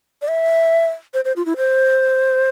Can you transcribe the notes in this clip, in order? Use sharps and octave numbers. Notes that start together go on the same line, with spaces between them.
D5
E5
C5
C5
F4
E4
C5